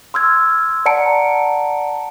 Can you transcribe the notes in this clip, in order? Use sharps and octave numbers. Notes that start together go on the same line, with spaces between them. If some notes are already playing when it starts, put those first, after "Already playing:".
C6 E6 F6 G#6
D5 F#5 A5 A#5 C#7 D7